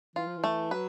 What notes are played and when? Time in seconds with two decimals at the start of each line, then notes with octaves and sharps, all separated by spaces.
0.16 E3 F4
0.27 F3
0.37 E3
0.44 A3
0.71 F#3 B4